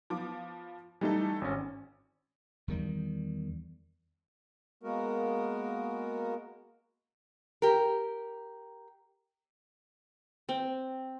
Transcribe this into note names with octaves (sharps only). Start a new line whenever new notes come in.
F3 B3 D6
E3 G3 A3 D#4 A4
G#1 C#4
E2 D#3 G3
G#3 A#3 B3 F#4 A#4
G4 A#4
C4